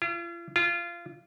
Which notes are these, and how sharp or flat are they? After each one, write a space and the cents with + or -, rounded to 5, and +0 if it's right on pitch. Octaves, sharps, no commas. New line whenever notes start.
F4 -40
F4 -20